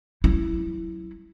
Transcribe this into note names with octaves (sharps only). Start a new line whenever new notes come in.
F#3 E4